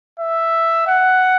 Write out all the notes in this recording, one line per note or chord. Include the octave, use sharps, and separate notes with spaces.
E5
F#5